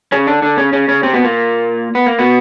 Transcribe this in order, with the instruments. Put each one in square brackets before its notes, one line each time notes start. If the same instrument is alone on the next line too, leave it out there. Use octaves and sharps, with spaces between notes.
[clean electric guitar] C#3 C#4
D3 D4
D3 D4
C#3 C#4
C#3 C#4
C#3 C#4
C3 C4
B2 B3
A#2 A#3
B3
A#3
B2 B3